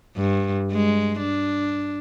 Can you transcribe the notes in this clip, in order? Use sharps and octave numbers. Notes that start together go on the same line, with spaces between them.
G2
G#3
D4